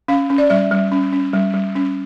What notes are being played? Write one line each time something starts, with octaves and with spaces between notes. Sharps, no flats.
C#4 F5
C#4
D5
G3 E5
G3
C#4
C#4
G3
G3
C#4